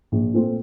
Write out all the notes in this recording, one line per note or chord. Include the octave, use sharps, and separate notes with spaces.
A#1
A#2 A3 C4 F4